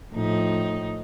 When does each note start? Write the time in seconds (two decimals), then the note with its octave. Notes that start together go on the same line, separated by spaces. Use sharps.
0.14 A2 F3 D#4